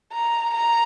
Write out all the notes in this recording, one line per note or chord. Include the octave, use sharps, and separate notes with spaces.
A#5
A#5